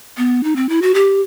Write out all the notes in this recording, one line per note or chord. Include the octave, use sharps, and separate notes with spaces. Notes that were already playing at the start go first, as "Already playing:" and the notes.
B3
D#4
C4
E4
F#4
G4